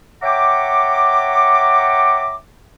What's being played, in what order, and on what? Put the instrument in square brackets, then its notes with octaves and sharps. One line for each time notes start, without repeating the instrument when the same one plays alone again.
[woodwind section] C#5 E5 F#5 G5 A#5 D6